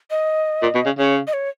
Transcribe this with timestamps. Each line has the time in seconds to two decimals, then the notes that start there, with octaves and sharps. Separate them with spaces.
0.10 D#5
0.63 A#2
0.75 B2
0.86 C#3
0.98 C#3 C#5
1.27 D#5
1.33 C#5